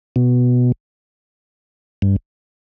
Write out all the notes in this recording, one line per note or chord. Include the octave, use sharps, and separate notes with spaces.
B2
G2